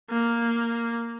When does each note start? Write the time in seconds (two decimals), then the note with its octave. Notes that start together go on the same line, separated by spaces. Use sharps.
0.10 A#3